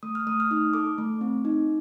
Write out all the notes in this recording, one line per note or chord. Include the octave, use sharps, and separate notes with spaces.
A3 D#6
F6
A3 D#6
F6
D#4 D#6
A4 D6
A3
C4
D#4